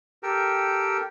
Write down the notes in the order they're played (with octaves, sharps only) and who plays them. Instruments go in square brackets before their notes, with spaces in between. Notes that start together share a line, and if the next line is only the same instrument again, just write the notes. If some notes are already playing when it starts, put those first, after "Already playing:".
[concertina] G4 A4 A#4 G5